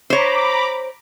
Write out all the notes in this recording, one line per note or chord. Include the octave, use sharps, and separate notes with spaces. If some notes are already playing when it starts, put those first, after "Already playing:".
C5 C#5 A#5 B5 D6